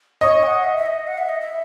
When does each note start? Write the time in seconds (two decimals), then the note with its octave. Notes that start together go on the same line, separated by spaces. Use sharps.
0.21 C#5 D#5
0.43 G#5
0.47 F#5
0.64 E5
0.77 E5
0.86 D#5
1.07 F#5
1.18 E5
1.29 D#5
1.41 E5